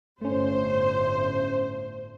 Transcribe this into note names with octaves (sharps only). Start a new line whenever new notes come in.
G1 A2 A3 C#4 C5